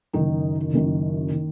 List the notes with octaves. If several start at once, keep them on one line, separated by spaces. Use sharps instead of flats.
F#1 F#2 D#3 D#4
F#1 F#2 D#3
D#3